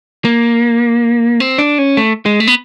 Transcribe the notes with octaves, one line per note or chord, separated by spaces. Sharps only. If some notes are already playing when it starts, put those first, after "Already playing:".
A#3
C4
D4
C#4
A3
G#3
A3
B3